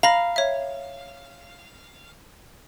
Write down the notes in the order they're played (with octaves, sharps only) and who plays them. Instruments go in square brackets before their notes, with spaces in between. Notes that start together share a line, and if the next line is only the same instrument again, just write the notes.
[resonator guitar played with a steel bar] F5 [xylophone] A#5 B5 A#6
[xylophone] C#5 E5